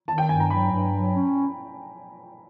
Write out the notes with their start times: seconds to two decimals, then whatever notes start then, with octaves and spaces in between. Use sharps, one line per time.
0.08 D#3 A5
0.18 G5
0.29 G2 G#5
0.40 A#5
0.50 F#3 B5
0.72 G2
0.93 F#3
1.15 C#4